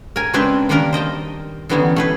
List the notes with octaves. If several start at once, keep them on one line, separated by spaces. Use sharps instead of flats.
A#4 G#5
C#3 G#3 C4 D4 B4 C5
D#3 G3 A#3 D4 A#4 A#5
C5 D#5 G5 A5
D3 E3 G3 B3 C#4 D#4
A3 G#4 B4